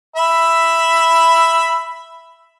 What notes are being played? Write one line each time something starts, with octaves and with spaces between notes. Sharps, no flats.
E5 B5